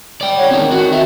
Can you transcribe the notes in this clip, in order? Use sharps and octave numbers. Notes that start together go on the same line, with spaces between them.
D5 G5
C#3 C#5 F#5
D#3 C4 D#4
F#4
A#4 E5